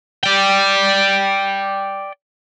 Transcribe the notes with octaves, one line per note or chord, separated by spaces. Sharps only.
D5 G5